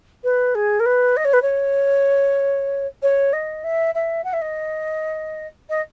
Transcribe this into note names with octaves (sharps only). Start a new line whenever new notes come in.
B4
G#4
A#4
B4
D#5
C#5
B4
C#5
C#5
D#5
E5
E5
F#5
E5
D#5
D#5